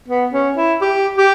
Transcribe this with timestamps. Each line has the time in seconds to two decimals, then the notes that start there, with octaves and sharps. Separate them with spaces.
0.08 B3
0.33 C#4
0.57 E4
0.81 G4
1.18 G4